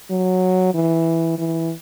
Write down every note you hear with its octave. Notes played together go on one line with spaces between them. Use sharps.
F#3
E3
E3